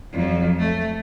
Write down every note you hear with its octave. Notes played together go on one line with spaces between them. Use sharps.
F2 F#3
A3